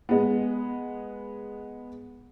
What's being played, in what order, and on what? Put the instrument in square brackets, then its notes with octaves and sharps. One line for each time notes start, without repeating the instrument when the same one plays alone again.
[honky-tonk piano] G#3 B3